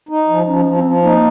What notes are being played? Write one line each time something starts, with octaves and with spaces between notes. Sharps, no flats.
D#4
F3
F3 C#4
F3
C4
F3
A#3 D#4